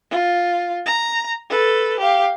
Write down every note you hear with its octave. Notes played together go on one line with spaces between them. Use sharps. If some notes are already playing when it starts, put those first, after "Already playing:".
F4
A#5
A4 B4
G4 F5